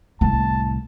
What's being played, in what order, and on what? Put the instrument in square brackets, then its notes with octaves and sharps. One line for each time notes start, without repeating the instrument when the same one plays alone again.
[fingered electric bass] C2 A2 [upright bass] B3 [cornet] A5